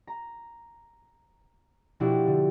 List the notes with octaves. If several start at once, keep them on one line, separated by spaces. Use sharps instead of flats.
A#5
B2 F3 D4 E4 F#4 G4
D3